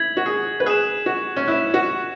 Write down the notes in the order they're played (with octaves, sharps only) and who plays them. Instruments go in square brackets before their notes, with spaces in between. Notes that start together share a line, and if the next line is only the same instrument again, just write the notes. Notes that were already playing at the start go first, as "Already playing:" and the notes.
Already playing: [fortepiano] E4 [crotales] G#6 B6 F#7
[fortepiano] F#4
G#4
B4
[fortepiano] G#4 [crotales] F#6 E7
[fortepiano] F#4
C#4
[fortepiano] E4 [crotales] F#6 E7
[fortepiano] F#4